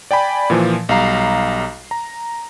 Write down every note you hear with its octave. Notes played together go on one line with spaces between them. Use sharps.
D5 G5 G#5 B5
A#2 E3 F3
B1 G3 F5 A#5 C7
A#5